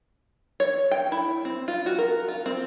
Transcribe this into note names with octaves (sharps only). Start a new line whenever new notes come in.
C#5
G5
E4
C4
F4
F#4
A#4
F4
C4